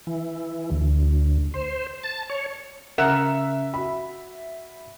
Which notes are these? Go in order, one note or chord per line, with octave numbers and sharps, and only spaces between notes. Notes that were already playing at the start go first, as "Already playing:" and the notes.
E3
D2
C5
A5
C#5
C#3 A#4 E5 F#5 E7
F#4 B5